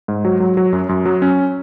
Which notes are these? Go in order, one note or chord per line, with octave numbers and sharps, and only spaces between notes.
G#2
F#3
F#3
F#3
F#2
F#2
F#3
C#4